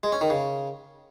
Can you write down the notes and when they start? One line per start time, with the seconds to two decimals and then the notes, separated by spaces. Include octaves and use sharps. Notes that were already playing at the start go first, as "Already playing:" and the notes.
0.03 G#3
0.12 C#4
0.21 D#3
0.30 C#3